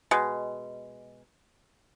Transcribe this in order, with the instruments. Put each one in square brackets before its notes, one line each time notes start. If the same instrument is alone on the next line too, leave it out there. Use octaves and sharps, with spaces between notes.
[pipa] B2 G#3